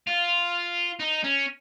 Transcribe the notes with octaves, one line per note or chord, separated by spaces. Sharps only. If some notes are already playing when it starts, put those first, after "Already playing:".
F4
D#4
C#4